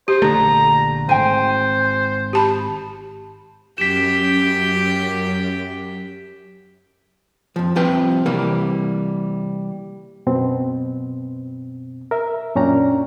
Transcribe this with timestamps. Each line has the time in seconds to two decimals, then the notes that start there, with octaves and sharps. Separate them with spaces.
0.08 G4 C5
0.22 A#1 D3 A3 A#5
1.09 G#1 C5 G5 G#5
2.33 G4 A5 B5
3.78 F#2 G4 G5 B6 E7
7.56 F2 F3
7.76 C2 C3 F3 B4 G5
8.26 C3 E3 G3 A#3
10.26 F#2 B2 C4
12.11 A#4 E5
12.56 F#2 A#2 C#4 D4 G5 A#5